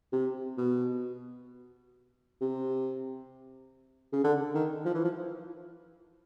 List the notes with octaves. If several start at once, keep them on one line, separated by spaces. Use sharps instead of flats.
C3
B2
C3
C#3
D3
D#3
F3
E3
F3